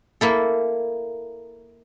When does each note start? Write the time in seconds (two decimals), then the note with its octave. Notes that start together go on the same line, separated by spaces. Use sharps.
0.21 A#3 E4 A4